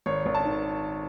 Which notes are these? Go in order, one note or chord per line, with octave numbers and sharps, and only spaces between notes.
G#1 C#5
G#1
A5
D#3